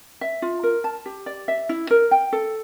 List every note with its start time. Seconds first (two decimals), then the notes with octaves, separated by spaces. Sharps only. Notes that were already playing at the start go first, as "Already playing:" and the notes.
0.21 E5
0.42 F4
0.63 A#4
0.84 A5
1.06 G4
1.26 D5
1.48 E5
1.69 E4
1.91 A#4
2.11 G5
2.33 A4